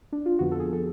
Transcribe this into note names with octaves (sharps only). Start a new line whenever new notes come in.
D4
F4
F2 D3 F3 B3 F#4
A4
G#4
A4